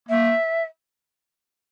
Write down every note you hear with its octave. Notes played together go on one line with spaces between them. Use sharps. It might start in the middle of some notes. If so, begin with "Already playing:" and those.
A#3 E5